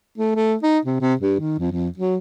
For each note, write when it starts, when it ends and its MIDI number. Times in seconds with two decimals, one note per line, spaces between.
0.18 0.32 57
0.35 0.56 57
0.63 0.79 63
0.85 0.99 48
1.01 1.14 48
1.21 1.36 43
1.40 1.59 51
1.59 1.71 41
1.72 1.89 41
1.98 2.17 54